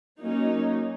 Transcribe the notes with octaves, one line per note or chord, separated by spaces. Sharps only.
F#3 A#3 C#4 D#4